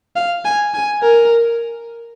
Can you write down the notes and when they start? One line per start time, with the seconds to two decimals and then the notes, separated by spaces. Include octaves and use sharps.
0.16 F5
0.45 G#5
0.74 G#5
1.03 A#4